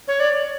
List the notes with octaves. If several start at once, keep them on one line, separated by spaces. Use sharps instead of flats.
C#5
D5